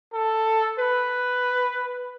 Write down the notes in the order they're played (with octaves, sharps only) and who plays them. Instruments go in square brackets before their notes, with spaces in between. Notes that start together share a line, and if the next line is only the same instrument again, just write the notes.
[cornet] A4
B4